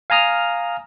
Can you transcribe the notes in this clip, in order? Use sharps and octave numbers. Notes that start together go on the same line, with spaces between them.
F5 G#5 A#5 D#6 F6